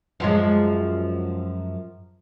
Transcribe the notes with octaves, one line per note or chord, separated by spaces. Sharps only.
F#2 F3 G#3